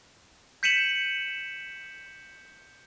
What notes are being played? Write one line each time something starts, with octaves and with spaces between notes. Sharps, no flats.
G6 B6 C#7 D#7 E7 F#7